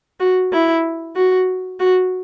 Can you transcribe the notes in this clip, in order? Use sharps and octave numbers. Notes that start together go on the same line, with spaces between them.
F#4
E4
F#4
F#4